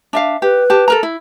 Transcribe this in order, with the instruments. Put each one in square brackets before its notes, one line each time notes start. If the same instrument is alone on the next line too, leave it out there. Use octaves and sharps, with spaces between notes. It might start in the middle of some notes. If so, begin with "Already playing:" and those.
[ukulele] D4 E5 F5
[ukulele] G4 [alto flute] B4
[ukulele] G4 A5
A4 A#4 A#5
E4